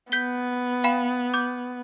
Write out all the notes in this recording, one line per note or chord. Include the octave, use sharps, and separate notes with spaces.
B3 G6 B6 G7
F5 G5 B5
D6 G6